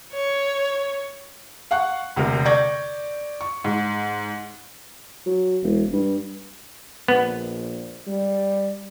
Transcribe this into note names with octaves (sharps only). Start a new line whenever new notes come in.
C#5
F5 F#5 C#6 F#6
E1 D2 C3 A#4
D5 C#6 G6 G#6 A#6
C#6
G#2
F#3
E1
G2
A#1 B3
G3